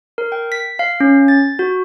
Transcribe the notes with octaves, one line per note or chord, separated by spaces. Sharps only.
A#4
G5
B6
F5
C#4
A6
F#4